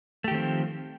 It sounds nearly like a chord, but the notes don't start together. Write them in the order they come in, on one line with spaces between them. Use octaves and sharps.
A3 G4 D#3 C4 F3